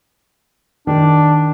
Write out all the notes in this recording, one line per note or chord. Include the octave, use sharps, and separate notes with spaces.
D#3 D4